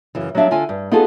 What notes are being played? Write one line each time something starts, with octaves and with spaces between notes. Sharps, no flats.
F#2 C#3 E3
F#3 G3 B3 D4 E5 F5
D3 F4 G#5
G2
B3 D#4 F4 F#4 G#4 A4